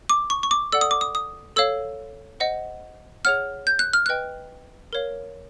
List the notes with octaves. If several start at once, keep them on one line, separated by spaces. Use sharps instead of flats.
D6
C#6
C#6
D6
A4 D5 F#5 E6
D#6
D6
D#6
D#6
A4 C#5 F5 E6
C5 D#5 F#5
G#4 C#5 F#5 F6
G6
F#6
F6
B4 D#5 G5 F#6
A#4 C#5 F5